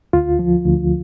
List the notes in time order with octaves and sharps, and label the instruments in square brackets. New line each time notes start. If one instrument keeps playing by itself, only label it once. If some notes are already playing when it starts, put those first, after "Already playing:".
[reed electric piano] D2 F4
F3
D2